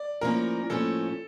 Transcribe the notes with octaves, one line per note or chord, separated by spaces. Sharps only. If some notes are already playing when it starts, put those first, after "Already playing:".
Already playing: D5
A2 F3 A#3 C#4 A#4
A2 F3 A#3 C#4 A4